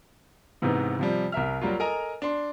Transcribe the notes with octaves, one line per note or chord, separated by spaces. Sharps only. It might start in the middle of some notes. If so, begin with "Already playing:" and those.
G#2 C3 E3 B3 D#4
C3 F3 G3
C2 A#4 E5 F6
F#3 G3 A#3 F4
A4 A#4 D#5 G#5 A#5
D4 C6